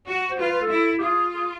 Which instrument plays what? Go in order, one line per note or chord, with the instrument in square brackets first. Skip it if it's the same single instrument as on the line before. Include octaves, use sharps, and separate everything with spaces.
[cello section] F#4
[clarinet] C5
[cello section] F4 [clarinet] B4
[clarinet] B4
A4
[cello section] E4
[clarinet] G4
[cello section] F4 [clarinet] G#4
[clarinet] G#4